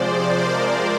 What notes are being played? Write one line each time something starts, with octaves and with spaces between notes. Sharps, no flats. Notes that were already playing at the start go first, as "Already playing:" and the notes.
Already playing: C3 F3 G#3 C5 D5
A#4 C5